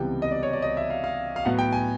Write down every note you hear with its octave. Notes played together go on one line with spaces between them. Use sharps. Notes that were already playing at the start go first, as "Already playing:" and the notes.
Already playing: C#2 C3 E3 G3 B3 G5
D#5
D5
C#5
D5
D#5
E5
F5
F5
F5
A2 F#3 B3 F#5
G5
G#5